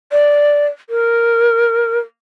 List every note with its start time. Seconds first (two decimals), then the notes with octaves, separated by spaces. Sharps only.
0.12 D5
0.89 A#4